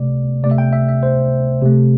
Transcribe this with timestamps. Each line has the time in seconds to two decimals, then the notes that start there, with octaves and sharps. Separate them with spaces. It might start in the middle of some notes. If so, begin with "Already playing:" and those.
Already playing: C3 A3 D5
0.44 C3 A3 D5
0.51 E5
0.58 G5
0.73 E5
0.89 E5
1.03 C5
1.62 C3 A3